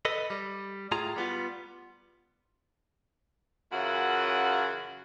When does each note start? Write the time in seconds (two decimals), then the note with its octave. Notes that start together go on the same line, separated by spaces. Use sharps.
0.05 A4 B4 D#5
0.30 G3
0.92 A2 F4 G#4 A#5
1.16 G3 B3 F4
3.72 F#2 C#3 E3 F4 F#4 F#5